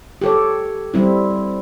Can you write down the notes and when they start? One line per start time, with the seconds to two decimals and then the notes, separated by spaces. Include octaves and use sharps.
0.22 G4 A4 C#5
0.94 G3 C4 E4